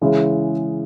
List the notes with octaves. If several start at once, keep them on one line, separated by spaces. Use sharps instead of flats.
C#3 E3 G#3 C#4 E4